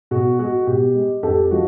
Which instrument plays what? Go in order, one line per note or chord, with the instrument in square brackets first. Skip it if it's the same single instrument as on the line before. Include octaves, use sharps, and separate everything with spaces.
[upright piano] B2 F#4 G#4
G#3 F#4 G#4
B2 G4
G#3
F2 G4 A4
F3 G#3 F#4